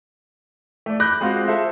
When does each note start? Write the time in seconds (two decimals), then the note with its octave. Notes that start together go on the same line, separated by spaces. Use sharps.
0.86 A3 D5
1.00 B5 D6 F#6 G6 A#6
1.21 G#3 C4 F4 F#4
1.48 A4 C5 E5